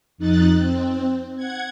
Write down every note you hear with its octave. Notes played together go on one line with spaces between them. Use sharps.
F2 D#4 F#6 A6
C4
F#5 G#6